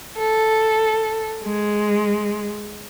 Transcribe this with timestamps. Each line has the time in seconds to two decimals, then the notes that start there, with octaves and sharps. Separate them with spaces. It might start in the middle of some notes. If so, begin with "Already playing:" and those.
0.16 A4
1.44 G#3